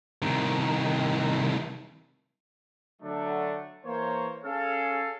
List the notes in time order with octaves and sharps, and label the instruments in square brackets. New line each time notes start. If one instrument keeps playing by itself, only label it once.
[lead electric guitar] C2 D#3
[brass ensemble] D3 F#3 A3 D4
E3 A#3 C5 C#5
C#4 G#4 A4 F5